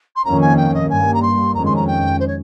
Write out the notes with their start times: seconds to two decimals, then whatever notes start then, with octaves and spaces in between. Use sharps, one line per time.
0.15 C6
0.24 F2 D#3 A#3 C#4 A#5
0.41 G#5
0.57 G5
0.74 D#5
0.89 G2 G3 A#3 G#5
1.14 A#5
1.22 C6
1.54 F2 D#3 G#3 C#4 A#5
1.65 C6
1.75 A#5
1.87 G5
2.19 C5
2.27 C#5